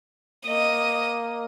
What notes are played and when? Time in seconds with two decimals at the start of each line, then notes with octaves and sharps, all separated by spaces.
0.47 A#3 D#5